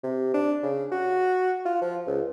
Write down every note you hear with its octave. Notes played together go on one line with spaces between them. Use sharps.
C3
D4
C#3
F#4
F4
F3
C#2